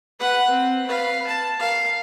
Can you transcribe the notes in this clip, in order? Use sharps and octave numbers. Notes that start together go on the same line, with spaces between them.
B4 F#5
C4
B4 F5
A5
A#4 F5